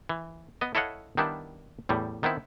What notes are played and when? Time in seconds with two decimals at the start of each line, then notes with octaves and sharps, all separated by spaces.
0.09 E3
0.61 B3 D#5
0.75 E4 A4 C#5 D#5 F5 F#5
1.17 D#3 G3 B3 D4 E4
1.89 E2 A2 G3
2.23 D#3 B3 C4 E4